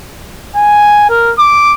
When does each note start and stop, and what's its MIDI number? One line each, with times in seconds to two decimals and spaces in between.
0.56 1.08 80
1.09 1.33 70
1.39 1.75 86